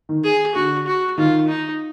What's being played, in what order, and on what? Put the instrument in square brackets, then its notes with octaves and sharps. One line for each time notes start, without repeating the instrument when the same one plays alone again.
[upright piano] D#3
[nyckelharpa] G#4
[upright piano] D3 [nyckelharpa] F#4
[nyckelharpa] F#4
[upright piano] D#3 [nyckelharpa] F4
[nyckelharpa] D#4